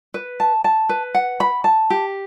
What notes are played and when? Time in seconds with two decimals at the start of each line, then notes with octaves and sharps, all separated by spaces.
0.14 B4
0.40 A5
0.64 A5
0.89 B4
1.15 F#5
1.40 B5
1.64 A5
1.90 G4